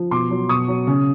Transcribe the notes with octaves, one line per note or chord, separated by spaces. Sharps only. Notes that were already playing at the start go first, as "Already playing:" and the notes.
Already playing: F3
B2 C6 D6
F#3
B2 C#6 D#6
F#3
C#3